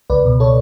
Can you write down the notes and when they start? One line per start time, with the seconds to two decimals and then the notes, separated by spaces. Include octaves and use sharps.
0.10 C#2 B4 D5
0.25 B2
0.40 A4 C#5